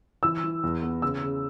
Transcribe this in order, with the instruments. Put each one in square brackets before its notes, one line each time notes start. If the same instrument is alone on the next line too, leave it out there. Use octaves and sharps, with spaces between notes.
[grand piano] E3 [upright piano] E6
[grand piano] E3
E2
B3
[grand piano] C#3 [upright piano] E6
[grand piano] C#3